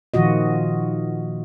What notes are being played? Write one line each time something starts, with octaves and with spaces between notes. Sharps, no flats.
A#2 D#3 F3 F4 F#4 D#5